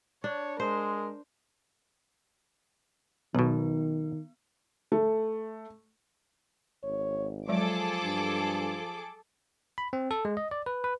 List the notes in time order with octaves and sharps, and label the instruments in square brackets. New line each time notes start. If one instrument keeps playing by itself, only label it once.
[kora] D4 [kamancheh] C#5
[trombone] G#3 [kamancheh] A#4 [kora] C5
[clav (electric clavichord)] B1 B2 [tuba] D#3 [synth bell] B3
[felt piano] A3
[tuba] G#1 [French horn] C#5
[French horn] F3 [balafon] F#3 G#3 D5 [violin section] G#4 A4 D6
[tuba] G2
[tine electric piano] B5
C4
A4
G#3
D#5
D5
B4
B4